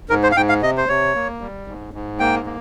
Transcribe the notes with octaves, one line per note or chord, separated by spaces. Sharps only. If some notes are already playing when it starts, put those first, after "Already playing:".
G#2 A#4
C5
F5
G#2 G5
F5
C3 D#5
C5
C3 C#5
A#3
G3
G#2
G#2
A#3 G5
A#3